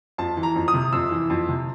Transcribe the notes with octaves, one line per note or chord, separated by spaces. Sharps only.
F2 A5
E3
A#5
F2
D#6
C3
F2 E6
E3
F2
C3